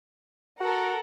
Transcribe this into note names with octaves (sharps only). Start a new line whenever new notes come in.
F#4 A4 A#4 F#5